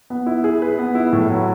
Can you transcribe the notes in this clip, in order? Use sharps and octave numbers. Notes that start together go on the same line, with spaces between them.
B3
E4
G#4
B4
B3
E4
A2
F#3